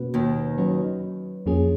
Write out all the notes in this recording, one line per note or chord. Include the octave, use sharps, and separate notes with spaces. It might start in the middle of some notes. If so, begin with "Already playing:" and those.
Already playing: B2 A#3 C#4 F#4 B4
D#2 D#3
F#3 C#4 F#4 B4
F2 F3 A#3 C#4 G#4